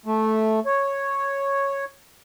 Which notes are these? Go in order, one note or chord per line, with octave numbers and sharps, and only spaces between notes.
A3
C#5